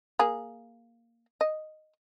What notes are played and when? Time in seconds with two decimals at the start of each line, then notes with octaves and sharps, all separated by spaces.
0.19 A#3 G#4
1.41 D#5